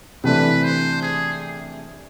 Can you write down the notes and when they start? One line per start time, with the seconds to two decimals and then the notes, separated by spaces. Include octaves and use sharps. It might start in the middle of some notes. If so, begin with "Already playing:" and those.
0.24 C3 E3 A3 D4 B4
0.64 C5
1.02 G#4